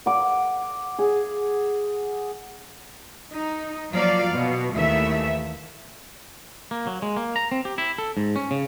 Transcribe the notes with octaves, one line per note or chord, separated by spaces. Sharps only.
F#5 D6
G#4
D#4
F3 F#3 A#3 D5 F5
B2
D#2 E3 A3 E5
A#3
F#3
G#3
A#3
A#5
C4
G4
E4
A4
G#2
C#4
C#3